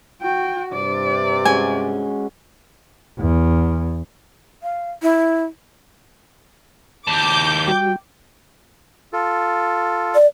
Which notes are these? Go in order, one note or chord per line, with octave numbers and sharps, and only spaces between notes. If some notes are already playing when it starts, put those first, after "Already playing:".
F#4 G5
G2 C3 D5
G#3 C#4 F#4 G#5
E2
F5
E4
D#2 A5 D6 G6
G3 F#4 G5
F4 A4
D5